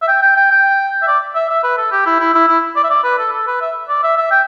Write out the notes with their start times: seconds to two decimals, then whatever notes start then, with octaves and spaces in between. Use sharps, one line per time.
0.02 E5
0.08 G5
0.22 G5
0.37 G5
0.51 G5
1.02 E5
1.08 D5
1.35 E5
1.50 E5
1.63 B4
1.77 A4
1.92 G4
2.06 E4
2.20 E4
2.34 E4
2.48 E4
2.76 D5
2.84 E5
2.90 D5
3.04 B4
3.18 A4
3.32 A4
3.47 B4
3.61 E5
3.89 D5
4.03 E5
4.18 E5
4.31 G5